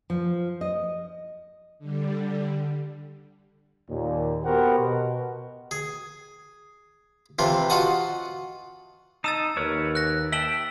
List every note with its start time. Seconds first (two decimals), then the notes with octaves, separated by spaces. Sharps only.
0.10 F3
0.61 D#5
1.79 D3 G3
3.90 D#2 A#2
4.44 B3 F#4 G4 A#4 C5 F#5
4.78 B2
5.71 G#4
7.39 C3 E3 F4 A4
7.70 F4 F#4 D#5 F#5 A5 D#6
9.24 D#4 A5 D#6 E6 A6
9.57 D#2 A#4 B4 C#5
9.95 F#6 A#6
10.32 E5 G5 A5 E6 F#7 G7